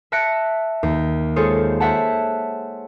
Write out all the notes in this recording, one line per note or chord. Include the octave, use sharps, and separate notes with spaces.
E5 A5 F#6 A#6 C#7 D7
D#2
G#3 F4 G#4 A4 C5 C#5
C5 C#5 E5 F#5 A5